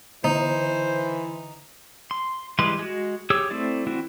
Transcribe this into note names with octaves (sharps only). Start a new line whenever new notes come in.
D3 E3 D#4 C5
C6
E3 G3 G#3 B4 C6
G#3 F#4
G4 G#4 C#5 E6
A3 C4 E4 D5
E3 C4 E4 F#4